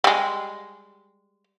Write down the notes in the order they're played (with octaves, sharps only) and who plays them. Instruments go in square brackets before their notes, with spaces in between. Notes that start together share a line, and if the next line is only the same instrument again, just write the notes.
[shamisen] G3 G#3